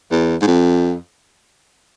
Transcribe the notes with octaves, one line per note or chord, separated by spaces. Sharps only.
E2
G#2
F2